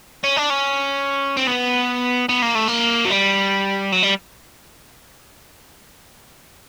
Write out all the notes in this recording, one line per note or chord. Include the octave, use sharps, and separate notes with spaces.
C#4
D4
C#4
C4
B3
B3
A#3
A3
A#3
F#3
G3
F#3
G3